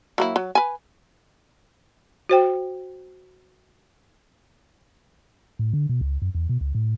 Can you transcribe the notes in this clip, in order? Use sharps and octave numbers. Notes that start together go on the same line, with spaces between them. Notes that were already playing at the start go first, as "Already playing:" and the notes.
F#3 A#3 E4
F#3
B4 G#5
F#4 C5 G5
A2
D3
B2
C#2
F#2
E2
B2
C#2
A2